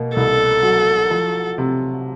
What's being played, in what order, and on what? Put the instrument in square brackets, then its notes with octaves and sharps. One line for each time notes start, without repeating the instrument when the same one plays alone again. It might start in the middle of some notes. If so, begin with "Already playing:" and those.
Already playing: [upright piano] B2 A#3
[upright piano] C2 [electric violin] A4
[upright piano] F#3
F3
C3